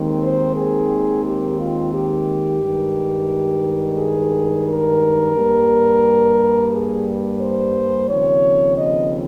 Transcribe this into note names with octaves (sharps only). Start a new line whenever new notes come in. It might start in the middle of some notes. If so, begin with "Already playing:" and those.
Already playing: D#2 D#3 G#3 C4
C5
G#4
G4
F4
G4
G2 D#3 G#3
G#4
A#4
G2 G3 A#3
G#4
C5
D#2 C#3 F3 C4 C#5
D#5